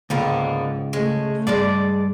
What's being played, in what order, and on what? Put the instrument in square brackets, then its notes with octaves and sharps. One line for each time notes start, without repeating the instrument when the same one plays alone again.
[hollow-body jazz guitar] C#2 [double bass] G#2 [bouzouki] D3 A#3 B3
[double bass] C#3 A3 [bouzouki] G#3
[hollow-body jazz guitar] G2 [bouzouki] G#3 D4 D5